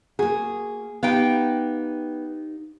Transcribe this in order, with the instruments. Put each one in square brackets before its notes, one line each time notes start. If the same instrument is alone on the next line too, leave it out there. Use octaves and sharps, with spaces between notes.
[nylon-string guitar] A#3 F#4 [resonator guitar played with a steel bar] G#4
[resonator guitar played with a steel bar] B3 G5 [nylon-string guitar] D#4 G4 F5